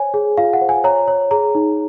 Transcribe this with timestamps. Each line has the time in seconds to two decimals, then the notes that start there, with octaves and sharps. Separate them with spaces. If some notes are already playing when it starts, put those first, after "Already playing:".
Already playing: C5 C#5 G#5
0.14 G#4
0.37 F4 F5
0.53 F#5
0.61 C5
0.69 G#5
0.84 C#5 A#5
1.08 C#5
1.31 G#4 A#5
1.55 D#4